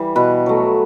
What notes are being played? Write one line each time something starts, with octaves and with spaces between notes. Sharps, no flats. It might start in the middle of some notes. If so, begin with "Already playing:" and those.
Already playing: E3 G3
B2 B4
F#3 A3